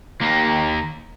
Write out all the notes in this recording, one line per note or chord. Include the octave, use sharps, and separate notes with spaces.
D#2 A#3